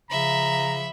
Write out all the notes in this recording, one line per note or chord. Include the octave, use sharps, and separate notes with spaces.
C#3 F3 E5 A#5 B5